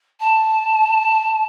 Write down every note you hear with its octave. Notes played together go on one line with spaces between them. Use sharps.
A5